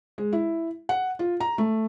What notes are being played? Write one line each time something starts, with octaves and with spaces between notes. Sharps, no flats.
G#3
E4
F#5
F4
A#5
A3